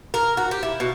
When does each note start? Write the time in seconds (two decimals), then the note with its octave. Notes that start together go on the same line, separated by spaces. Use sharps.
0.14 A#4
0.37 F#4
0.51 G4
0.63 E4
0.80 B2